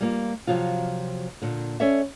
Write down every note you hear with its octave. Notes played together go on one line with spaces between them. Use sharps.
G3 A#3 F4
C3 F3 F#3 F4
A#2 D3
C#4 A4 C#5 D5 E5